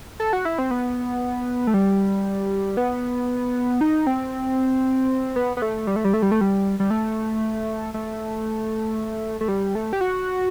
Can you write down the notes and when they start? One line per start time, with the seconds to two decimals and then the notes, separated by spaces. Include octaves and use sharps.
0.20 A4
0.33 F#4
0.45 E4
0.59 C4
0.71 B3
1.67 A3
1.74 G3
2.77 B3
3.81 D#4
4.07 C4
5.36 B3
5.57 B3
5.62 A3
5.87 G3
5.96 A3
6.05 G3
6.14 A3
6.22 G3
6.31 A3
6.41 G3
6.80 G3
6.90 A3
7.94 A3
9.41 A3
9.48 G3
9.75 A3
9.93 G4
10.01 F#4